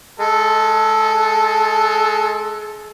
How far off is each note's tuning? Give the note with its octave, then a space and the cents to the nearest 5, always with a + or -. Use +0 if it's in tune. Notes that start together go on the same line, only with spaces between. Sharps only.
G#3 +30 A4 +0